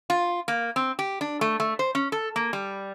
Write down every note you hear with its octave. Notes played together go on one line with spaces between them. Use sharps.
F4
A#3
C4
G4
D4
A3
A3
C5
C#4
A4
A#3
G3